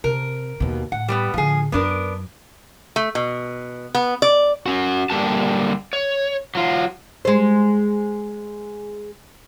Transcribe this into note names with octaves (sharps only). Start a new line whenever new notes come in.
C3 A#4
D#2 B2
A2 F#5
G3 A#3 B3
A2 D3 F3 G#4
F#2 F#3 B3 D4 A#4
A3
B2
B3
D5
C#4 F#4
D3 G3 A#3 G4 A5
C#5
F#3 F4
G#3 C5